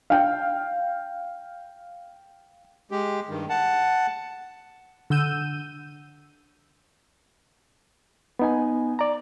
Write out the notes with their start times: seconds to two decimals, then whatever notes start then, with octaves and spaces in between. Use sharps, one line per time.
0.10 F5 G5
2.91 G#3 G4
3.29 G2 D#3
3.50 F#5 A5
5.10 D3 F#5 E6 G6 D#7
8.39 B3 D#4 G#5
8.99 D5 A#5